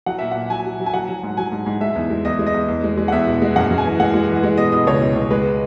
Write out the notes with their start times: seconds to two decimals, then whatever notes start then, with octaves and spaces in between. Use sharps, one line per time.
0.06 F#3 F#5
0.19 A#2 E5
0.31 F#5
0.35 A#2
0.50 F#3 G#5
0.65 F#3
0.79 F#3
0.86 G#5
0.94 F#3 F#5
1.09 F#3
1.23 G#2
1.37 F#3 G#5
1.52 G#2
1.66 G#2
1.81 G#3 E5
1.95 E2
2.10 G#3
2.25 E2 D#5
2.39 G#3
2.46 D#5
2.54 E2
2.68 E2
2.84 G#3
2.97 G#3
3.08 F#5
3.12 E2 E5
3.26 B2
3.42 G#3
3.56 F#2 F#5
3.70 F#2
3.78 G#5
3.84 E3
4.00 G#3 F#5
4.14 G#3
4.29 E3
4.43 G#3
4.57 B2 D#5
4.72 B2 D#5
4.87 C#2 C#5
5.01 B2
5.15 C#2
5.30 G#3 B4